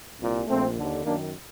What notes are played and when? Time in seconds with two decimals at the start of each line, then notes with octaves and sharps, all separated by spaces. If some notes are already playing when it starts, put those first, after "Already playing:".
0.19 C2 A#2
0.47 A#1 A#2 A3 C4
0.76 D#2 D3
1.05 F#2 D#3 A#3 D4